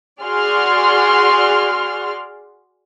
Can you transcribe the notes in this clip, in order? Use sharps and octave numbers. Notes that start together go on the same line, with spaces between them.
F#4 G#4 D5 C6 F6